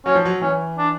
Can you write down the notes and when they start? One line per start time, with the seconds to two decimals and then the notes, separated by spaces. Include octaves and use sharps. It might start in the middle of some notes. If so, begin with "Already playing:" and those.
0.06 F#3 C#4
0.15 F3
0.25 F#3
0.41 E3 C#4
0.78 D4